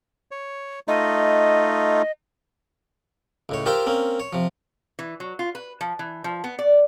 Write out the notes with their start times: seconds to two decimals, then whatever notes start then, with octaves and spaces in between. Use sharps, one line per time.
0.31 C#5
0.88 A3 D#4 F4 D#5
3.49 C#2 A2 C#5
3.66 F4 G4 A#4 C5 E5 F5
3.87 A#3 C4 C#4
4.20 C#5
4.33 C3 F3
4.99 E3
5.20 F#3
5.39 F4
5.55 B4
5.81 F3
5.99 E3
6.24 F3
6.44 B3
6.59 D5